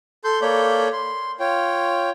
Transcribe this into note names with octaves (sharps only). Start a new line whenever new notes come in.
A4 C6 G6
A#3 A4 C#5 D5 B5 G6
C6
F4 C#5 G5